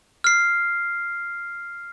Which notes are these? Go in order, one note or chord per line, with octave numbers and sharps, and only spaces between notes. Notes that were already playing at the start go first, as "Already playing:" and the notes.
F6 C7